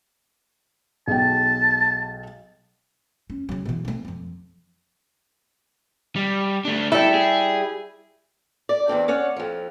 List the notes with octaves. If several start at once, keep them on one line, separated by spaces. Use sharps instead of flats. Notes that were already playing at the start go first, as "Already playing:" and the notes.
B1 G#3 G5 A5
C#4
C#3 F#3
B2 E3
A3 C4
F2 F3
G3
A3 D4
G3 E4 A4
G#4
D5
E2 G2 C4 D4
C#4 C#5 D5 F#5
F2 F3